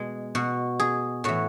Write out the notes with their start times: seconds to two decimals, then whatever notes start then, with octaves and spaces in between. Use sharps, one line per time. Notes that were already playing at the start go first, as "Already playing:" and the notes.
Already playing: B2 G#3
0.35 B2 F#4
0.79 G#4
1.24 A2 E3 F#4